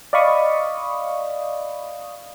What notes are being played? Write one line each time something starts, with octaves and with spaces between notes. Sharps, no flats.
D5 D#5 F5 B5 C#6 D#6